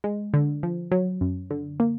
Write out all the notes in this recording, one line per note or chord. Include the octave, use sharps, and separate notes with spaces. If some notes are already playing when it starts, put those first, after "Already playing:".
G#3
D3
F3
F#3
F#2
D3
A#3